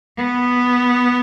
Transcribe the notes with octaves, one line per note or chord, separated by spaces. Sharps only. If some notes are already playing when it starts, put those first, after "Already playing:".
B3